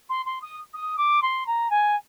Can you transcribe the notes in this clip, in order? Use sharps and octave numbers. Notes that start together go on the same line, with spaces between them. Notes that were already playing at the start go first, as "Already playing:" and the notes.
C6
C6
D#6
D#6
D6
C6
A#5
G#5